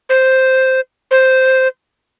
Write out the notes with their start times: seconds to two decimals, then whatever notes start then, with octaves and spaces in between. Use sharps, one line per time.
0.09 C5
1.11 C5